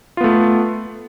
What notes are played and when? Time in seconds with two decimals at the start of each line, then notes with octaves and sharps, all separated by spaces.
0.17 F4
0.21 B3
0.24 A3